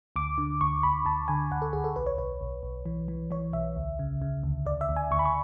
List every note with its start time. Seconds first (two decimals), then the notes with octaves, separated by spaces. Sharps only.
0.16 D2 D6
0.38 D3
0.61 D2 C#6
0.83 D2 B5
1.05 D2 A5
1.28 D3 G#5
1.51 D2 F#5
1.62 A4
1.73 D2 G#4
1.84 A4
1.96 B1 B4
2.06 C#5
2.18 B1 B4
2.41 B1
2.63 B1
2.86 E3
3.08 E3
3.31 E3 C#5
3.53 B1 E5
3.76 D2
3.99 C#3
4.22 C#3
4.43 D2
4.66 D2 D5
4.81 E5
4.89 D2
4.96 G#5
5.11 D2 C#6
5.19 B5
5.25 C#6